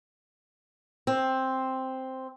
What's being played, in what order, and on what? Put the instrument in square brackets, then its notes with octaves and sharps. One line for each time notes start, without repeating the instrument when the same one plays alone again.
[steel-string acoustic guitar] C4